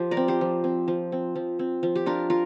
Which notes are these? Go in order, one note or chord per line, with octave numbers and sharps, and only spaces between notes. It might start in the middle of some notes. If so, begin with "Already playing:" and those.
Already playing: F3 G4 C5
A#4 D5
C4
G4 C5
F3
C4
F3
C4
F3
C4
F3
G4
D4 F4 A#4
F4 A#4